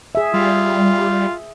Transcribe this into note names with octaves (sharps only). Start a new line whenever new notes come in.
G#4 E5
G3 F4